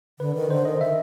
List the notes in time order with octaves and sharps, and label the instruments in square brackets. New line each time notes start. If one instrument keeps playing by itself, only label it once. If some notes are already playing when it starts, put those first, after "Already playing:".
[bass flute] D3 [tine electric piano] B4
[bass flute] D#3
[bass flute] D3 [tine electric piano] C5
[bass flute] D#3 [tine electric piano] D#5
[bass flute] D#3 [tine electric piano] E5